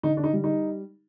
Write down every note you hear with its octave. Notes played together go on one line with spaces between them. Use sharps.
D3 D#4
D4
D#4
G3
D#4